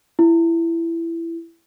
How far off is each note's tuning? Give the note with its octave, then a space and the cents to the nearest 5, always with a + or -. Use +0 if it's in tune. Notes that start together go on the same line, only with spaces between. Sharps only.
E4 +15